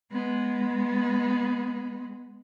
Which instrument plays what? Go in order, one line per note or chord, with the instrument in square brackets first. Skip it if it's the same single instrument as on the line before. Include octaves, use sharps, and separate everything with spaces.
[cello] G#3 B3